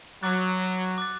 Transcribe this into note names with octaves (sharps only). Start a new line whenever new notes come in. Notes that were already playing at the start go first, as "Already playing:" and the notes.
F#3 D6 F#6 A6
D6 F#6 A6